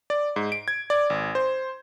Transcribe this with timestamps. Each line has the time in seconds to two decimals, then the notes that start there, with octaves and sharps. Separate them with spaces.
0.10 D5
0.36 G#2
0.52 D7
0.68 G#6
0.90 D5
1.10 G#1
1.35 C5